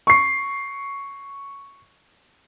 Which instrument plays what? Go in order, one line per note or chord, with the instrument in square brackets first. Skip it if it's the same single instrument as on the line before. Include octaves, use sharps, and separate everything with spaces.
[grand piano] C#6 C7